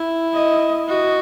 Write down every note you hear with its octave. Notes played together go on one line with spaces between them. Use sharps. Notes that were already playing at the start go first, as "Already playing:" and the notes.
Already playing: E4
D#5
F#4 D#5